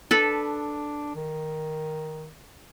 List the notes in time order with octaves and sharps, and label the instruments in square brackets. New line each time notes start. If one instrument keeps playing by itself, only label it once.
[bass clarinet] D4 [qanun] A4 B4
[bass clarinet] D#3